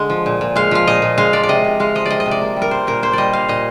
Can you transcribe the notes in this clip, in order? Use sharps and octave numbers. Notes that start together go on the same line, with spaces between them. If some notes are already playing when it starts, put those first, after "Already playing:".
Already playing: D3 G#3
F3
A#2
A#2
G#3 F5
F3 F5
A#2 D#5
A#2
G#3 F5
F3 D5
D5
C3 D#5
C3
G#3 F5
F3 D#5
C3 D5 D#5
D#5
C3
D5
A#3
G3
A#4
A#2 C5
A#2 A#4
A#3 C5
G3 D5 D#5
A#2 F5
A#2 D#5